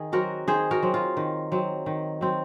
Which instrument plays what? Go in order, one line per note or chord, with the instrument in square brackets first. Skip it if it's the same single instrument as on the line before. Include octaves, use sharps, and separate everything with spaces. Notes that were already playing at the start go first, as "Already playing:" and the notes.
Already playing: [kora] D#3 G#4
F#3 C4 F#4 A#4
D#3 G#4 C5
F#4 A#4
F#3 C4
F4
D#3
F#3 C4
D#3
F#3 C4